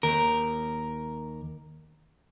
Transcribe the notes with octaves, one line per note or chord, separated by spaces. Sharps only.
D#2 A#4